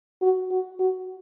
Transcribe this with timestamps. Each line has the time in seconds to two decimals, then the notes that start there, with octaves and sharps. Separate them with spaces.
0.22 F#4
0.51 F#4
0.80 F#4